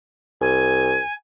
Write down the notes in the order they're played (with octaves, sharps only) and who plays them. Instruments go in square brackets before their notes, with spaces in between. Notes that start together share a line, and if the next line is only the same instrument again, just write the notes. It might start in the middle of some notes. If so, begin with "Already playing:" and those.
[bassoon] C2 [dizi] G#5